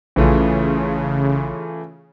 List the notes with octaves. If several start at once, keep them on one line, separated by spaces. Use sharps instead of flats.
A#1 C#3 E3 A3 F4